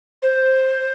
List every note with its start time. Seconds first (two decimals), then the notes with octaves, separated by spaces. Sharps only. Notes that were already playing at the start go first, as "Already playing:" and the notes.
0.22 C5